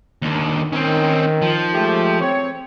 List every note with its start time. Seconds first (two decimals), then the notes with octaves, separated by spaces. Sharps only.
0.22 D#2 D3
0.73 D#3 C4 C#4
1.42 F3
1.74 G#3 A3 G4
2.20 C4 C#5